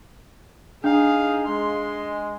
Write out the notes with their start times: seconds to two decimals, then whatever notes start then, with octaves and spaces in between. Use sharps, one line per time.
0.84 D4 D#4 G#4 F5
1.47 G#3 C6